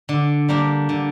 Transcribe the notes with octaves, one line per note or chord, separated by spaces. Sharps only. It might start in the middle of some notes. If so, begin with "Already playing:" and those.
D3
G3 A#3 D4
D3